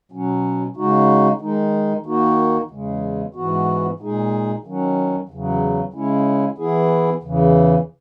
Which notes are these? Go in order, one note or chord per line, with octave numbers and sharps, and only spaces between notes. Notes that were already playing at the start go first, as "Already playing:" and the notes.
B2 F#3 C#4
C#3 G#3 D#4 F#4
D#3 G#3 D#4
D#3 A#3 D#4 F#4
E2 C#3 G#3
G#2 E3 B3 F#4
A#2 G#3 D#4 G#4
D#3 F#3 C#4
E2 C#3 F#3
C#3 G#3 C#4 E4
E3 B3 E4 G#4
E2 C#3 E3